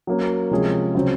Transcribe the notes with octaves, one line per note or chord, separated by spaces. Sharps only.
F#3 A#3 C#4
C3 F3 G#3 C#4 G#4
C#3 F#3 C4